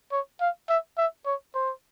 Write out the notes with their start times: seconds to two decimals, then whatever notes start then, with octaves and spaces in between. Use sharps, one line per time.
0.12 C#5
0.41 F5
0.69 E5
0.98 E5
1.26 C#5
1.55 C5